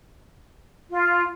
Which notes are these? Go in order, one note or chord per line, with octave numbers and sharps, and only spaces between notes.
F4